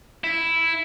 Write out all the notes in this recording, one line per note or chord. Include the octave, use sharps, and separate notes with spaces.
E4